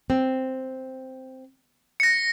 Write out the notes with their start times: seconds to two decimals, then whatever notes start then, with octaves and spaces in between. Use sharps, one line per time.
0.10 C4
2.00 A#6 C#7